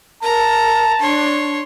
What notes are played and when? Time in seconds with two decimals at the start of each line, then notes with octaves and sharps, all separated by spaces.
0.23 A#4 A5 A#5
1.00 D4 C#5 C6